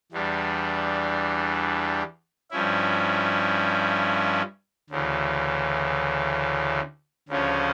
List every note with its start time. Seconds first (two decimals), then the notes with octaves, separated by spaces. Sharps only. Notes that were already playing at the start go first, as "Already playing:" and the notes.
0.12 E2 E3 G3 D4
2.51 G2 F3 C#4 E4
4.90 D2 C#3 E3
7.29 D2 C#3 F3 C#4